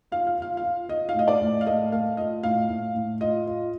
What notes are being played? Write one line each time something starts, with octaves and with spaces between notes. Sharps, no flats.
F4 F5
F5
F4 F5
F5
F4
F4 D#5
F5
A2 D#5
D5
A2
F5
A3 D#5
A3 F5
F4 D#5
A2 F5
A2
A2
F4 D#5
F4